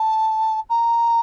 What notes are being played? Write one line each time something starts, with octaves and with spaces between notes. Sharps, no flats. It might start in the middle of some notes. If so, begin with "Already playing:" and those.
Already playing: A5
A#5